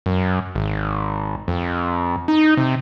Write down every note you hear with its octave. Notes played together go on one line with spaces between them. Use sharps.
F#2
G#1
F2
D#4
C3